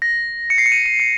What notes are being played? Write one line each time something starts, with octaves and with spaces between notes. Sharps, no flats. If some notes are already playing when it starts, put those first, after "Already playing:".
A#6
C#7
C7
C#7
D#7
D#7
C#7